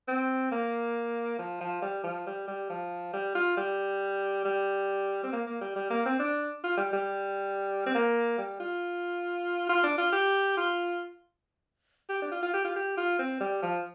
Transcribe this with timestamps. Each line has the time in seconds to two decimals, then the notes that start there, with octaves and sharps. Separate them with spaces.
0.08 C4
0.51 A#3
1.39 F3
1.61 F3
1.82 G3
2.04 F3
2.26 G3
2.47 G3
2.69 F3
3.13 G3
3.35 F4
3.57 G3
4.45 G3
5.24 C4
5.32 A#3
5.47 A#3
5.61 G3
5.76 G3
5.90 A#3
6.05 C4
6.19 D4
6.63 F4
6.77 G3
6.93 G3
7.86 C4
7.95 A#3
8.38 G3
8.60 F4
9.69 F4
9.84 D4
9.98 F4
10.12 G4
10.57 F4
12.09 G4
12.22 D4
12.31 F4
12.43 F4
12.54 G4
12.64 F4
12.76 G4
12.97 F4
13.19 C4
13.40 G3
13.62 F3